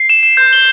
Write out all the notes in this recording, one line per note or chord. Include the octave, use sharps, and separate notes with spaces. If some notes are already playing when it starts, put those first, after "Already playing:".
Already playing: C7
E7
E7
G6
G7